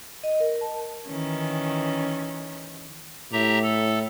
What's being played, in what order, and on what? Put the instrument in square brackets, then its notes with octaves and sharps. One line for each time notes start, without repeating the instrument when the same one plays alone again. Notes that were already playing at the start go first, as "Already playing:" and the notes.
[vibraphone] D#5
A#4
A5
[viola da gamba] D#3 E3 C#4
[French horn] A2 [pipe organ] G4 E5 A#5
[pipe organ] A4